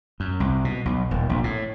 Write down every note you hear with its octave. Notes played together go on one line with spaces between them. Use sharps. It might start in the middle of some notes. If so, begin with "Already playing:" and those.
F#2
C2
B2
B1
D#1
A#1
A2